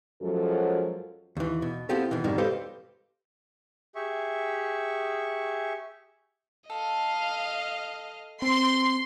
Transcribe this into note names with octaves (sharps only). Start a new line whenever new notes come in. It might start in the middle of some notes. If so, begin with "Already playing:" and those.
F#2 F3 F#3 G#3 F#4 A4
D#2 E3
B2
B3 C4 E4 F4 G4 A4
B2 D#3 E3
F2 G#2 B2 D#3 G3
G4 A4 B4 C5 D#5 F5
G4 G#4 E5 C#6
A4 D#5 F5
C4 C6